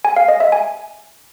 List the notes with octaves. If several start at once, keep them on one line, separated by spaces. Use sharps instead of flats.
G#5
F5
D#5
E5
G#5